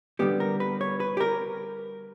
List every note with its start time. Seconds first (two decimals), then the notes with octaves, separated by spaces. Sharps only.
0.19 D3 G3 B3 G4
0.40 A#4
0.60 B4
0.81 C#5
1.00 B4
1.17 G4
1.20 A#4